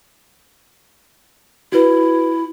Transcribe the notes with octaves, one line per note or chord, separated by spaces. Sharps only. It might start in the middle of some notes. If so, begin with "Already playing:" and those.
E4 F#4 B4